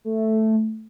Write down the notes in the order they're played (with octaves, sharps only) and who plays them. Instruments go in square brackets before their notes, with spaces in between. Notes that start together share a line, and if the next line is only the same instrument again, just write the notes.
[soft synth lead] A3